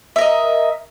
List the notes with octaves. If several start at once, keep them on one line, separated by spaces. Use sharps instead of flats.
A#4 D#5 E5